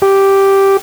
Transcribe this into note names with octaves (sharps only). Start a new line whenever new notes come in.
G4